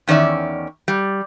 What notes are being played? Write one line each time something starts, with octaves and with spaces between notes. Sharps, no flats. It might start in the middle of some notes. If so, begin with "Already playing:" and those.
E2 D#3 C#4 D5 E5
G3